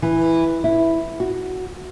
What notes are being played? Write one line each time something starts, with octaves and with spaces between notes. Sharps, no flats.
E3
E4
F#4